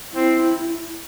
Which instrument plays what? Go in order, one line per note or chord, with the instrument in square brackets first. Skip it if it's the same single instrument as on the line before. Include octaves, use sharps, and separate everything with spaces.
[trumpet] C4 [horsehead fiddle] E4